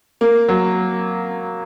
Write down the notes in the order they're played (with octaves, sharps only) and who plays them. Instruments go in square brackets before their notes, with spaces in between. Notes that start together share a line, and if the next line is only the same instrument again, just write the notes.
[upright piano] A#3
F#3